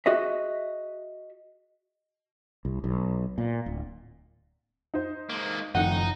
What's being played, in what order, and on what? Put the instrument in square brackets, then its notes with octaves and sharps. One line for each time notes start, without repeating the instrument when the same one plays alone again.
[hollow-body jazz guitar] F#4 G#4 D#5 E5
[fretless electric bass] C2
B1
A#2
D1
[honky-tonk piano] D#4 C5
[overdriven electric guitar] G#3 A#3
[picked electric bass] F#1 F3 [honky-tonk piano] F2 A2 D#3 [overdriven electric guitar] D#4 [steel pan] F#5